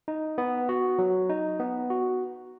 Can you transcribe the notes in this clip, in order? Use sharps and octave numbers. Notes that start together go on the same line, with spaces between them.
D#4
B3
F#4
F#3
D#4
B3
F#4